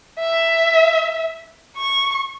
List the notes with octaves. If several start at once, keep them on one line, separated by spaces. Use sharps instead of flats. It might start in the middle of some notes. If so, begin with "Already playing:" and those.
E5
C#6